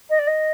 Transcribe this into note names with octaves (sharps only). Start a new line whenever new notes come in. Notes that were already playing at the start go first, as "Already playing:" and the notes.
D#5
D5
D#5